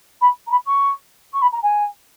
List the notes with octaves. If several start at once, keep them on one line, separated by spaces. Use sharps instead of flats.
B5
A#5
B5
C#6
C#6
B5
A#5
G#5